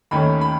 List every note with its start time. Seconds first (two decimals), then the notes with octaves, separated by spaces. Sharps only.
0.11 D#2 D#3 A3 C#4 B5
0.41 B5